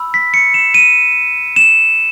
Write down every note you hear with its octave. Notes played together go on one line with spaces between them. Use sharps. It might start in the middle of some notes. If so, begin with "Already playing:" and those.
Already playing: B5 E6
B6
C#7
E7
D#7
E7